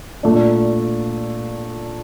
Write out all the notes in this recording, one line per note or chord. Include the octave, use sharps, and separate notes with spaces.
A#2 A3 D4